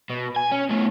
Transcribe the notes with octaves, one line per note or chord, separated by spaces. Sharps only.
B2
G#5
C#4
B2 A3